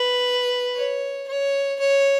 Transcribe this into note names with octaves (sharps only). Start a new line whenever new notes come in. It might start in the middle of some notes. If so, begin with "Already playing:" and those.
Already playing: B4
C#5
C#5
C#5